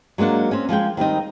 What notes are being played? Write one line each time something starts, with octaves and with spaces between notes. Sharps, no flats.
F#3 G#3 A#3 D4 F#5
C4 C#4
F3 G#3 G#4 G5
D#3 G3 C4 D#4